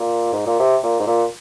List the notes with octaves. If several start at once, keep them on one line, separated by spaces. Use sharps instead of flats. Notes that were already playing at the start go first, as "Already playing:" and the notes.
Already playing: A#2
G#2
A#2
C3
A#2
G#2
A#2